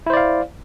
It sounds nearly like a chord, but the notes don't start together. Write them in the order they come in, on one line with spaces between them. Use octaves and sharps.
E4 C5 D5 F5